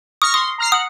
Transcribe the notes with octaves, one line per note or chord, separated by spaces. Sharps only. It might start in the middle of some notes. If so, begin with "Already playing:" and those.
C#6 D#6 F6 A#6
C6 D#6
A#5 F6 C7
F#5 D#6